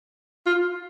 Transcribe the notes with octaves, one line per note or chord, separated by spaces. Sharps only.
F4